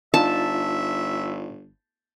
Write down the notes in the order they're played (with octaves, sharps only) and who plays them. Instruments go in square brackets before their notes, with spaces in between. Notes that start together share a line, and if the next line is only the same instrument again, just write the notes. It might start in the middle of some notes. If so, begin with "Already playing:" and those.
[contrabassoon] G1 [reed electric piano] D4 D#4 F4 [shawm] E5 [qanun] A5